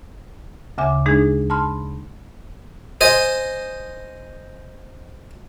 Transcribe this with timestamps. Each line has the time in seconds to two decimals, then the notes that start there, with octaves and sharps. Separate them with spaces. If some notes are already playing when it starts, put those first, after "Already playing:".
0.78 D2 C#3 E5 G#5 D6
1.06 G#3 D4 D#4 G#4
1.50 A5 B5 C6 F6
3.01 C5 D#5 G#5